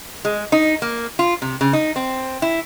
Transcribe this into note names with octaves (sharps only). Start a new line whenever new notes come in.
G#3
D#4
A#3
F4
C3
C#3
D#4
C4
E4